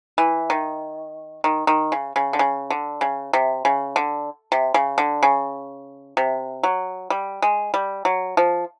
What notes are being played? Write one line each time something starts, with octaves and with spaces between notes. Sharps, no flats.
E3
D#3
D#3
D#3
C#3
C#3
D3
C#3
D3
C#3
C3
C#3
D3
C3
C#3
D3
C#3
C3
F#3
G3
G#3
G3
F#3
F3